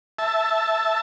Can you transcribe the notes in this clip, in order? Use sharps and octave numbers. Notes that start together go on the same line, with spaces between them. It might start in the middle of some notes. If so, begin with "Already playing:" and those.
E5 A5